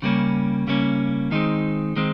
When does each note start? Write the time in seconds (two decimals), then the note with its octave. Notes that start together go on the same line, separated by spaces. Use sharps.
0.02 C#3 G3 A#3 C#4
0.67 C#3 G3 A#3 C#4
1.31 D#3 G#3 C4 D#4
1.96 D#3 G#3 C4